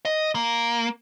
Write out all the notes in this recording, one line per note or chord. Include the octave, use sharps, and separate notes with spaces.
D#5
A#3